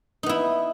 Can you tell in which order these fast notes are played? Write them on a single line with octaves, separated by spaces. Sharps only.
D#4 B3 E4